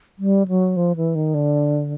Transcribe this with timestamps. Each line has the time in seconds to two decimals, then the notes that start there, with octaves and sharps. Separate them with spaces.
0.19 G3
0.48 F#3
0.76 F3
0.96 E3
1.15 D#3
1.34 D3